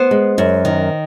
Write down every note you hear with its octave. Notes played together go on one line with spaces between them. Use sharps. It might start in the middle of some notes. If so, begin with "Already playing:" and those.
Already playing: B3 C5
G#3
F#2
D#3